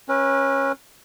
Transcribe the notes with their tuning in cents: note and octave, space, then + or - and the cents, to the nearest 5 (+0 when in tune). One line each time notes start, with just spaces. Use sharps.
C#4 -20 B4 -40